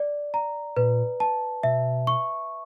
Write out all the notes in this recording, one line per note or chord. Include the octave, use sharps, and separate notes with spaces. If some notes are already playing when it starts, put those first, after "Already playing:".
Already playing: D5
A#5
A#2 B4
A5
B2 E5
C#6